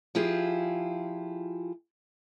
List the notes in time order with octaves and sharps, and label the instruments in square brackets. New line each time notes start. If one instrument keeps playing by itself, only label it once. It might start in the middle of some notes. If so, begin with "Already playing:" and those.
[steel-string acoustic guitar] F3 E4 F4 G4 G#4